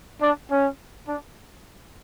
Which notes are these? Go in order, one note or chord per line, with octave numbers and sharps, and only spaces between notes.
D4
C#4
D4